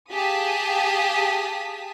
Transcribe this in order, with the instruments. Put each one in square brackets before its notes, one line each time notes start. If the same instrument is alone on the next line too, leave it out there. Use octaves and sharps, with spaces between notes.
[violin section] G4 G#4 F5 A5 D#6 B6